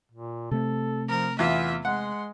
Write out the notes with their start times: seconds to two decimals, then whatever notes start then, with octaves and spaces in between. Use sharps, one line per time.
0.12 A#2
0.51 C3 A3 A4
1.09 F3 A#4
1.39 E2 B3 F4 E5
1.85 G#3 F#5 C6